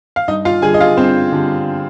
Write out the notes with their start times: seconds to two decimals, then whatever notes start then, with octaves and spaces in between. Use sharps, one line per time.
0.16 F5
0.28 G2 D#4 D#5
0.45 F4 F5
0.62 D3 G3 G#4 G#5
0.74 D#5
0.80 F4 F5
0.97 G2 C4 C5
1.32 D3 G3